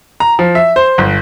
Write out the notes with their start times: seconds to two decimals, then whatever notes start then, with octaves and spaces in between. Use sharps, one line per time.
0.20 A#5
0.39 F3
0.55 E5
0.76 C5
0.98 G1